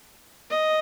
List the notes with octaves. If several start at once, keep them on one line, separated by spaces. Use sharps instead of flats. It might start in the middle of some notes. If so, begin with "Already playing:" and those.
D#5